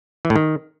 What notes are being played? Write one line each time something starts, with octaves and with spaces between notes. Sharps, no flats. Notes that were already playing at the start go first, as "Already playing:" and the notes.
E3
A2
D#3